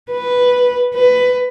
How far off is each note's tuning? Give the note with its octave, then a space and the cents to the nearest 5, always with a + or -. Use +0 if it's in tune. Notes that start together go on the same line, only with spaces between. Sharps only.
B4 +0
B4 +15